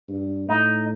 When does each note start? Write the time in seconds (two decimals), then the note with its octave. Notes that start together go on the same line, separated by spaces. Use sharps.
0.09 G2
0.48 A2 D#4